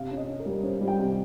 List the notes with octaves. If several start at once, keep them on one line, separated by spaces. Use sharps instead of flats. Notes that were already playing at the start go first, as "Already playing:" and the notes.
Already playing: C3 F5
C#4
D#5
C#4
A#4
G3
C#4 C5
G3
G5
C3